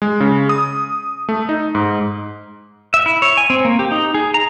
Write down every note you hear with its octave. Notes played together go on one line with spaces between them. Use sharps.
G#3
C#3
D#6
A3
D#4
G#2
E5
E4
C#5
G#5
C4
A#3
G4
D#4
G#4
A#5